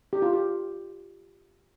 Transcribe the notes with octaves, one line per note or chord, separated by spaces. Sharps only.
G4
F4
G4